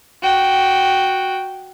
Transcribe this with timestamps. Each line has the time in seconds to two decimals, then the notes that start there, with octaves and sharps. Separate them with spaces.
0.22 F#4 G5